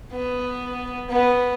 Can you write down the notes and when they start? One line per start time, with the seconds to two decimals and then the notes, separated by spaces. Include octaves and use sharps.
0.12 B3
1.09 B3